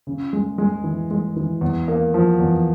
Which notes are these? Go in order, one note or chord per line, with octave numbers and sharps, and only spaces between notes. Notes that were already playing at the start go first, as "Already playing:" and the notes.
C#3
G#3
G#3
E3
G#3
E3
E2
A#3
F3
E2